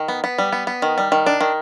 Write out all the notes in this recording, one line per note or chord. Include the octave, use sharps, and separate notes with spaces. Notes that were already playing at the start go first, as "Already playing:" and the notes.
Already playing: D#3
B3
B3
G3
B3
B3
D#3
G3
D#3
D4
D#3